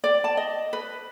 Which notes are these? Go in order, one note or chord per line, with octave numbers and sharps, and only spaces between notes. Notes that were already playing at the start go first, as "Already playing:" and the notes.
D5
A5
D#5
B4